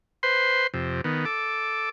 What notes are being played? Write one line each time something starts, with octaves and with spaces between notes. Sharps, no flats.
B4 C5 C6
F2 C3
D#3 B3
A4 D6